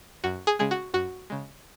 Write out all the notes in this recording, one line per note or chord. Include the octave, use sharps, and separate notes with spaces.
F#2 F#4
G#4
C#3 G#3 G#4
F#4
F#2 F#4
C#3 G#3